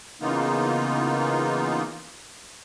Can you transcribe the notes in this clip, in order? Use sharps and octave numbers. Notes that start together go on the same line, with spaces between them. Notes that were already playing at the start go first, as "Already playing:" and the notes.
C#3 E3 A#3 B3 D#4 F4